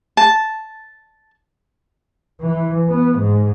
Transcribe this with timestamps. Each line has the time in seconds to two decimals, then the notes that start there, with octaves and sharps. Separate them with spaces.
0.17 A5
2.41 E3
2.89 B3
3.19 G#2